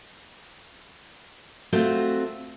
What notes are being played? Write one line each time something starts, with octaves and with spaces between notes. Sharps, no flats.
A3 C4 F4 F#4